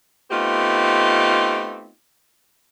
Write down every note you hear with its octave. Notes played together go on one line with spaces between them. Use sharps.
A3 B3 C4 D#4 F4 G4